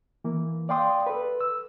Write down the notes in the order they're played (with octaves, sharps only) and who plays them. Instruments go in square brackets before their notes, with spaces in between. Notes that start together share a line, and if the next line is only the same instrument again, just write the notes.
[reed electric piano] E3 A#3
D5 F5 G5 C6 D#6
A4 B4
E6